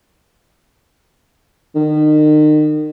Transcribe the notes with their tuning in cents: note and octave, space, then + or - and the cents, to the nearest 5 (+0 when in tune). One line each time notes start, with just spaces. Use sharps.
D#3 -35